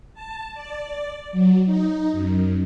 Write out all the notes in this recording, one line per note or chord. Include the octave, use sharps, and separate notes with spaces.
A5
D5
F#3
D#4
F#2